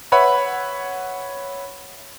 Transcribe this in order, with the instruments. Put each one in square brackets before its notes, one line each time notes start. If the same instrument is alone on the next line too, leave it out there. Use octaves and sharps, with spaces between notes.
[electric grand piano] B4 C#5 E5 F#5 B5